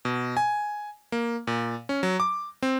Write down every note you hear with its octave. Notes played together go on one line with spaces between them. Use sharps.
B2
G#5
A#3
A#2
C#4
F#3
D6
C4